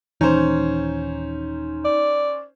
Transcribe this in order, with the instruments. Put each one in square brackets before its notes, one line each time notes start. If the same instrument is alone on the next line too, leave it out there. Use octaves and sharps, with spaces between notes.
[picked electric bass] D#1 D#2 E3 [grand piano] C#4 C5 [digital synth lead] D#4
[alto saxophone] D5